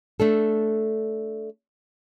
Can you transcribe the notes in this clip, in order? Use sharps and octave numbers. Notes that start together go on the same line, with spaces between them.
A3 D4 A4